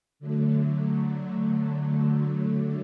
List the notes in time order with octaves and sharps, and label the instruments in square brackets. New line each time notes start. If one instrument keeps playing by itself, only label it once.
[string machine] D3 F#3 A3